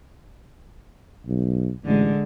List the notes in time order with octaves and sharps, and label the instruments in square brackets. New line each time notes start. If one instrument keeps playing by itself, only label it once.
[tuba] B1
[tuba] A1 [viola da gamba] D3 G#3